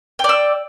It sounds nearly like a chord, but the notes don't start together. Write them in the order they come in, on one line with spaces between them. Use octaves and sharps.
G5 D5 E6